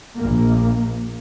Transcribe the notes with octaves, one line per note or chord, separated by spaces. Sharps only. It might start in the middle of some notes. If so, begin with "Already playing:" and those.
A#1 A#3